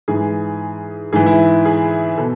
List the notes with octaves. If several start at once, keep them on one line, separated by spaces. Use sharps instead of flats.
G#2 E3 G#4
G#2 E3 G#4
E4
G#4
B2 A4